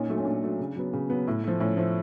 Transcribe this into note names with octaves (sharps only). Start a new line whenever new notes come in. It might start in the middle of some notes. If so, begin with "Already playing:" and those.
Already playing: A#2 C#4 D#4
F#3 A3
C#4
A#2 D4
F#3 A3
C#3
F#3 B3
C#3
F#3 B3
A2
F3 A3
A2 C#4
F3 A3